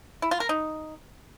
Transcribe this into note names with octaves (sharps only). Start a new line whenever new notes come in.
E4
F4
A#4
D#4